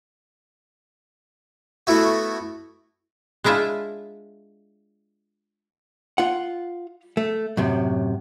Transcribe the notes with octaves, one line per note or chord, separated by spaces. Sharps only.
A3 B3 E4 F#4
G#3 D4 E4 F4 E5
F4 F#5
A3
F#2 A2 C3